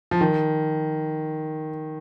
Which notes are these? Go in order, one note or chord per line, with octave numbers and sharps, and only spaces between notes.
F3
D#3